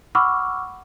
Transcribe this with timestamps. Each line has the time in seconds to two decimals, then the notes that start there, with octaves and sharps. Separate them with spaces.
0.15 F#5 B5 C#6 D6 E6 F6